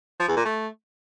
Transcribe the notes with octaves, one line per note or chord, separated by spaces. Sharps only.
F3
E2
A#2
A3